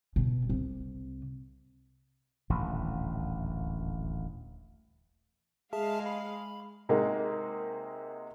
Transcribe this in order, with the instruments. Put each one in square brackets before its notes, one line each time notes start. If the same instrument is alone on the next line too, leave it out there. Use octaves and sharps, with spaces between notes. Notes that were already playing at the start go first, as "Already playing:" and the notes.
[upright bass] B2 B3
C2 C3
[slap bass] D#1 A1 D2
[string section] G#3 F5 [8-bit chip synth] G#4 E5 A5
[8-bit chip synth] B5
[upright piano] C3 G#3 A#3 D#4 F#4